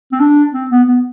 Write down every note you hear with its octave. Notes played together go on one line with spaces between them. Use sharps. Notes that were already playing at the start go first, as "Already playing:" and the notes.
C4
D4
C4
B3
B3